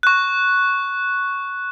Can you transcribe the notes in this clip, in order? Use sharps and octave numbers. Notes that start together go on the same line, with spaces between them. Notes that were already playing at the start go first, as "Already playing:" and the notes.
C#6 F#6